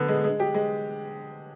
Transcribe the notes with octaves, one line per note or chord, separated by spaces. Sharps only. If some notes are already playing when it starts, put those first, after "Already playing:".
Already playing: D3 B3
G#3
G#3
G4
G#3